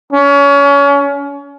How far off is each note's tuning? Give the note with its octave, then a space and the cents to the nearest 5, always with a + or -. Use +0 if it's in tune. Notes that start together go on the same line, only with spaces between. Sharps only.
C#4 +30